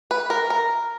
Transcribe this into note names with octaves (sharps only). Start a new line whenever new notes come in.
B4
A#4
A#4